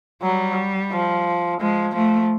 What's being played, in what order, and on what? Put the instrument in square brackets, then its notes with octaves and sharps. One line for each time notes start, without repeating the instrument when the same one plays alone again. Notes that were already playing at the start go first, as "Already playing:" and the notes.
[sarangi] F#3 [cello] G3
[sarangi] F3
[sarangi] F3 [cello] G#3
[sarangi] F3 [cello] A3